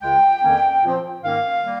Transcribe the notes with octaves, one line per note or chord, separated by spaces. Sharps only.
C#2 C#3 G#3 G5
F2 D#3 A#3 C#4
A#2 F3 C4
G#2 D#3 A#3 C#4 F5
G3 A#3